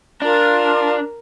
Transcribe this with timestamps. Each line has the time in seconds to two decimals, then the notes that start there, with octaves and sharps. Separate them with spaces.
0.22 D4 F4 A#4